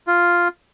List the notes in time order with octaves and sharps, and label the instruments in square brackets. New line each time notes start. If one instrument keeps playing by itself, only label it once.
[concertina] F4